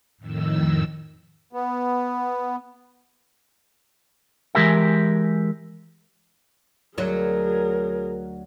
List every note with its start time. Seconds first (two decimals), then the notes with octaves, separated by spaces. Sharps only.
0.18 F2 A2 D#3 E6
1.53 B3
4.55 E3 G#3 G4 A#4 E5
6.98 D2 F#3 G#4 A#4